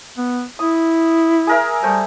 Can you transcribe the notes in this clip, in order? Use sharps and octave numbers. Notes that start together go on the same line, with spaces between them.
B3
E4 D#6
G#4 A#4 E5
G3 A3 C5 G#5